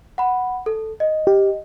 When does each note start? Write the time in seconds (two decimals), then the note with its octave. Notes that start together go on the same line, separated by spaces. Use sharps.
0.18 F#5 B5
0.66 A4
1.00 D#5
1.27 G4